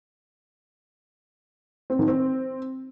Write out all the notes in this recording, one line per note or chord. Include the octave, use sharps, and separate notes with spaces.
C4
D#3
C4